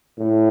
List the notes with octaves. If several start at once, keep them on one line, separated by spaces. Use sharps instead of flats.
A2